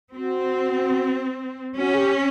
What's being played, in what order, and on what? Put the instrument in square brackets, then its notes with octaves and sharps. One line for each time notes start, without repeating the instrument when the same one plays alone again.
[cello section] C4 [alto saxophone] F#4
[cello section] C#4 [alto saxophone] F#4
[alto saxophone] G#4
G4